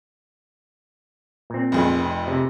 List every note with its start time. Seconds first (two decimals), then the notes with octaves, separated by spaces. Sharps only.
1.50 A#2 C4
1.72 F1 F2 G#4
2.27 C3